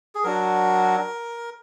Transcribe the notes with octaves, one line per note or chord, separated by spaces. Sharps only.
G#4
F#3 D4 F#4 A#4